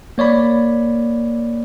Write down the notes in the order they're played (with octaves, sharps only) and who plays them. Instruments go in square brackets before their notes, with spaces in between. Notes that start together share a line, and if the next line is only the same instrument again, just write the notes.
[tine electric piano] A#3 C#5 D5 B5